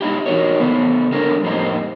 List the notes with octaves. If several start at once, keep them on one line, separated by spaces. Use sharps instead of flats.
G#3 D#4 E4 G4
E3 D#4 F#4 A#4 C#5
C#3 A3 B3
D3 G3 A3 C#4 A#4
F2 A2 G3 A#3 C4 D#4